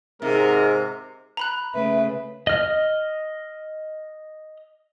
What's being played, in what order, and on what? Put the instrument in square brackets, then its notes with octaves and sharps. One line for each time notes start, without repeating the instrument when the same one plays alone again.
[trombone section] G#2 [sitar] C3 [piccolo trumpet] A#4
[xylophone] A#5 B5 F#6
[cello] C#3 A3 [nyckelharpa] B4 [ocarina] E5
[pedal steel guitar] D#5 F6